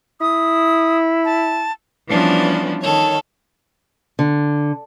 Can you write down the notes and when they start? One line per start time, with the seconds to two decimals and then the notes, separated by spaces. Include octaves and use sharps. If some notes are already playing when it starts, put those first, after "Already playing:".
0.21 E4 D#6
1.25 A5
2.08 E3 F3 G3 B3 C#4 D4
2.81 D#3 A4 C#5
4.19 D3